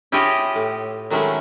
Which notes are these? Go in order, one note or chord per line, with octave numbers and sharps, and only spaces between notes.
E4 F4 G4 G#4 C#5 D#5
A2
D#3 F#3 G#3 A3 C#4 E4